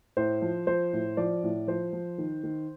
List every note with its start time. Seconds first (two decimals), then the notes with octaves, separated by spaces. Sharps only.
0.17 A2 C5
0.42 F3
0.67 F3 C5
0.93 A2
1.17 F3 D5
1.44 A2
1.67 F3 C5
1.93 F3
2.18 D#3
2.44 D#3